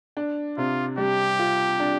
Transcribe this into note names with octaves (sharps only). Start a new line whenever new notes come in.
D4
C3 F4
G3 G4
F4
D4